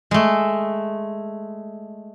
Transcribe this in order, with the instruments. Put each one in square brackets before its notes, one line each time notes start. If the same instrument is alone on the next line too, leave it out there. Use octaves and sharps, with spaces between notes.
[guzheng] G#3 A3